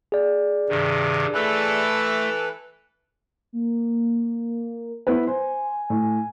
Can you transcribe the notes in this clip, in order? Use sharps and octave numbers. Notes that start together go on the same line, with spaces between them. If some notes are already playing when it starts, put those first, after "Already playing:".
G#4 D5
G2 C3 D#3
E3 A3 A4 B4
A#3
B3 E4 B4
C5 G#5
A2